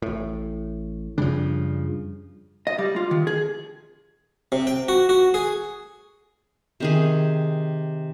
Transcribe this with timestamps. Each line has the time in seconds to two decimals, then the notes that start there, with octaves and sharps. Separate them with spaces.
0.02 A1 A2
1.18 F#2 C#3 F3 G3 D4
2.67 D#5
2.79 G3
2.96 F4
3.11 D#3
3.27 G#4
4.52 C3
4.67 G5
4.89 F#4
5.09 F#4
5.34 G#4
6.80 C3 D#3 G#4